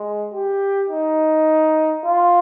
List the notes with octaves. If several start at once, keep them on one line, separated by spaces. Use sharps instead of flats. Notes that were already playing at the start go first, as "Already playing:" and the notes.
Already playing: G#3
G4
D#4
F4